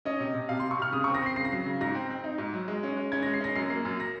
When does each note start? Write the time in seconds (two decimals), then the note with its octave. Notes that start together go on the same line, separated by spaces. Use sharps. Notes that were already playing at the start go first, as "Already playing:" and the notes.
0.05 C#4 D#5
0.20 C3
0.34 C3
0.49 C3 F5
0.60 C6
0.63 C3
0.71 C#6
0.78 C3 F6
0.93 C#3 D#6
1.04 C#6
1.08 C4
1.14 A#6
1.22 C4 C7
1.36 C#3 C7
1.45 A#6
1.52 F#3 C7
1.66 C#3
1.81 G#2 A#6
1.95 C4
2.10 C4
2.24 D#4
2.38 G#2
2.53 F#3
2.68 G#3
2.83 C#4
2.97 G#3
3.12 C#4 G#6
3.23 A#6
3.26 G#3
3.34 C7
3.40 C#4 A#6
3.55 F#2 C7
3.70 A#3
3.85 F#2
4.00 A#6